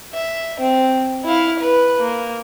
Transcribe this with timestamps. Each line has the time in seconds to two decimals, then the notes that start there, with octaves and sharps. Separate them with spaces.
0.14 E5
0.60 C4
1.25 E4 F5
1.59 B4
2.00 A#3